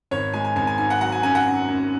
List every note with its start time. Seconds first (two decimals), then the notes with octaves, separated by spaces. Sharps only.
0.11 G#1 C#5
0.34 G#3 G#5
0.44 G#5
0.56 G#1 G#5
0.67 G#5
0.78 G#2 G#5
0.90 F#5
1.00 F#3 F#5
1.12 G#5
1.23 F#2 G#5
1.35 F#5
1.46 F#2
1.68 F#2